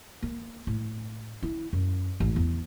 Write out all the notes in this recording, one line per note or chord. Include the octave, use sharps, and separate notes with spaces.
A#3
A2
E4
F#2
A1
E2